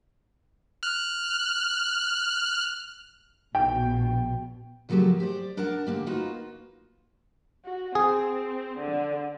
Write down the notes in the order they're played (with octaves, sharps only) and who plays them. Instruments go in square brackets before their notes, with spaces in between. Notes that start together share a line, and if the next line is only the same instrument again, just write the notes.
[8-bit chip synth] F6 F#6
[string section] A#1 B2 [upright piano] G5
[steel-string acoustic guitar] C#3 F3 F#3 A#3 G4 A4
G4 C5 D5
D4 A#4 F#5 A5
D3 A#3 G4
A#3 D#4 F4 F#4 B4
[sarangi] F#4
[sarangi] C4 [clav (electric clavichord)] G#4
[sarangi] D3